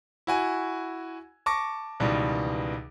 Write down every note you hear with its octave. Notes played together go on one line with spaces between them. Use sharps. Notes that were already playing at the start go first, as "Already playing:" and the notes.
E4 F#4 G#5
A5 C#6 D6 A#6
C#2 B2 D#3 E3 G3